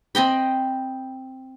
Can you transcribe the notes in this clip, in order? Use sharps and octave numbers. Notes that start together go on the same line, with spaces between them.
C4 D#5 G5 B5